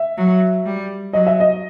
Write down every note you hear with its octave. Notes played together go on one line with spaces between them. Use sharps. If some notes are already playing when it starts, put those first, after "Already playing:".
Already playing: E5
F#3
G3
F#3 D#5
E5
D#5